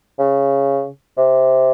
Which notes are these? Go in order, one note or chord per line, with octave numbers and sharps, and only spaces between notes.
C#3
C3